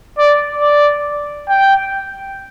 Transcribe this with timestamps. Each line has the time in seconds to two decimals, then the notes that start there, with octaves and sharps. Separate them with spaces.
0.18 D5
0.61 D5
1.49 G5